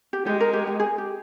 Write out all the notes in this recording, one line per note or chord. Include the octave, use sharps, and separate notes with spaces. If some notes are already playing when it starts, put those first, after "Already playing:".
G4
G#3 G4
A#4
G4
G4
G#4
G4